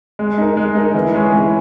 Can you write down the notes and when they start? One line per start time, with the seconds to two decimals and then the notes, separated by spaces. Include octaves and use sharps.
0.19 G#3
0.38 D#4 A#4
0.57 G#3
0.75 D#4 A#4
0.94 E3
1.14 G#3 C#4 G#4
1.33 E3